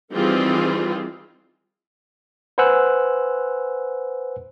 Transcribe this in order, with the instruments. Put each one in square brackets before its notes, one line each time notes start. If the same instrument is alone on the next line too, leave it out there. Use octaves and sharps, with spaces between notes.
[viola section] D#3 E3 G3 C4 F4 G#4
[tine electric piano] B4 C5 F#5 G#5 E6 F#6